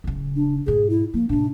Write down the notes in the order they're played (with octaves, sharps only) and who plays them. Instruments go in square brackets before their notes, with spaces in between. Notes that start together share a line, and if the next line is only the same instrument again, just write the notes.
[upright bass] D1 C#3
[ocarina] D4
[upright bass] G#2 B2 [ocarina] G#4
[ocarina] E4
[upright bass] F3 [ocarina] A#3
[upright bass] A2 C3 [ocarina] D4